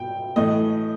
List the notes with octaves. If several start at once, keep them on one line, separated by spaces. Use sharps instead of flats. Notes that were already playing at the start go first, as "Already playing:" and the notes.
Already playing: G5
A2 E3 A3 D#5